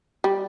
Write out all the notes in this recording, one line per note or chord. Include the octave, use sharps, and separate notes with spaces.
G3